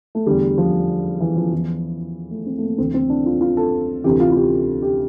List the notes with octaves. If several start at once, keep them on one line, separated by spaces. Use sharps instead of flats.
A3
E2 D3 G3
F3
E3
F3
E2 E3 F3
A3
C4
A3
A#3
D2 C3 E3 C4
C4
D4
F4
F4
A4
D2 C3 E3 G4
F4
F4
G4
G4